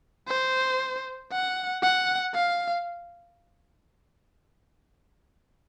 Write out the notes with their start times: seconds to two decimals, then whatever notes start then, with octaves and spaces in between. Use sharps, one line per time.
0.28 C5
1.32 F#5
1.83 F#5
2.35 F5